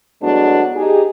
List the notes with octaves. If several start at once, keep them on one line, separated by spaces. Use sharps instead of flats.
A2 F#3 G#3 B3 D4 F#4
D#4 G4 G#4